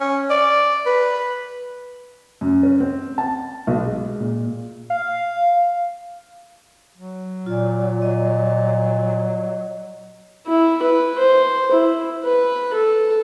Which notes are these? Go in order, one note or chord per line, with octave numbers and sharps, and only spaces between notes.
C#4
D5
B4
F#2
C#4
C4
A5
B1
G#3
A#2
F5
F#3
A#2 F4 D5
D#5
E4
B4
C5
E4
B4
A4